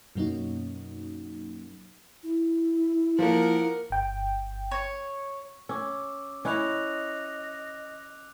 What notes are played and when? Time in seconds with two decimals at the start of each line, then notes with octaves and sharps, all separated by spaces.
0.15 F#2 B2 F#3 A#3 C#4 D#4
2.23 E4
3.19 F3 A#3 A#4 F#5
3.90 G1 G5
4.71 C#5
5.69 C#4 D6 E6
6.45 C#4 E4 D#5 D6 F#6 F7